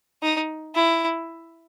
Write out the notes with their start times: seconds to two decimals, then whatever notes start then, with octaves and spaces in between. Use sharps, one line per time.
0.23 D#4
0.75 E4